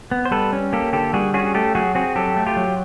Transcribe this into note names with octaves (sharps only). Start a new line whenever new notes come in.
B3
C5
G3 A4 B4
C#4
A#3 G4 A4
D3 G4 A4
G3 F#4 G#4
C#4 F#4 G#4
A3 G4 A4
F#3 F#4 G#4
C4 F#4 G#4
F#3 G4 A4
A3
F4 G4
F#3